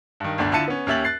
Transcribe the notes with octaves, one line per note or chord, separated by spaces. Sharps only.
G2 D#3
G1 D2 D4
D3 E4 F4 A5 C#7 D#7
B3 C#4
D#2 C#4 G4 E5 A6 F#7
F#6 A6 C7